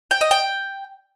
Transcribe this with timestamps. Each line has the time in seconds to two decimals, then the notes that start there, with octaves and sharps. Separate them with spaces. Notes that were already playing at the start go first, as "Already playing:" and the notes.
0.11 G5
0.21 D#5
0.31 G5